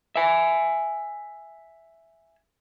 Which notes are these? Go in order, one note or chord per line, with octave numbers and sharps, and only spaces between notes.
E5 G#5